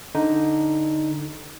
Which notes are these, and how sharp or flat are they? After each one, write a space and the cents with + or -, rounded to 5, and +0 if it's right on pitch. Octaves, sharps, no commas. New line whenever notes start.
D3 +0 D#4 +0